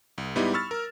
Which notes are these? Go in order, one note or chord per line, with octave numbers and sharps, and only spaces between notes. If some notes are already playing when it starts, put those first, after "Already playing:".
C2
G#2 G3 B3 D#4 E4 G4
B5 C#6 E6 F6 A6
A#4